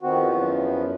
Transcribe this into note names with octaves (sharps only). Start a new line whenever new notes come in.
E2 D#3 F3 B3 C4 F#4
F#2